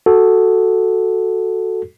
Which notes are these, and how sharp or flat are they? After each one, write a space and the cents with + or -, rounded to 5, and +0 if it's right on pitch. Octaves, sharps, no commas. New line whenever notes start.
F#4 +0 A4 +0